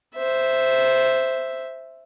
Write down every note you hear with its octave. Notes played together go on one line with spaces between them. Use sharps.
C5 E5